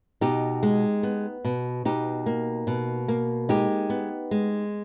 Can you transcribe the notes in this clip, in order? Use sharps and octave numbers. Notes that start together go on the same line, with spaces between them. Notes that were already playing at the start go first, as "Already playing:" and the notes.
B2 D#4 G4
G#3
B3
B2
B2 D#4 G4
A#3
B2
A#3
G#3 D#4 G4
B3
G#3